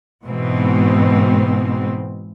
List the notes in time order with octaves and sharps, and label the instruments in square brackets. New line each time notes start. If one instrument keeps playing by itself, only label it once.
[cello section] G#2 B2 E3 G#3 C4